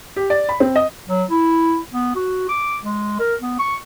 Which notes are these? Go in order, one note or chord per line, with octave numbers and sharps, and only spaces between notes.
G4
D5
B5
C4
D#5
F#3
E4
B3
F#4
D6
G#3
A#4
B3
C#6